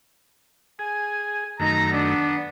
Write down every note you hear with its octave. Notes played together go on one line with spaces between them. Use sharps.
G#4 G#5
F#2 D#3 A3 D#4 A#5
B3 D4